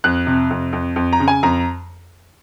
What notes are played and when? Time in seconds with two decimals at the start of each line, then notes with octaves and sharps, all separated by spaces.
0.04 F2 F#6
0.27 C3
0.50 F2
0.73 F2
0.96 F2
1.13 A#5
1.20 C#3
1.28 G#5
1.43 F2 A#5